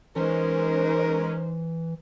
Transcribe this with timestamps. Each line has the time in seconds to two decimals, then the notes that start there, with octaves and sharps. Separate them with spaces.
0.16 E3 G#3 C#4 D#4 A#4 C5